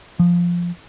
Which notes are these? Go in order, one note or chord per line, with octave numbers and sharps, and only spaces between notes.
F3